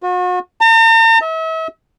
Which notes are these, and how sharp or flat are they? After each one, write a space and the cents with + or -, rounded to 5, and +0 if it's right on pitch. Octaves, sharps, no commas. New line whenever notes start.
F#4 -40
A#5 -45
E5 -40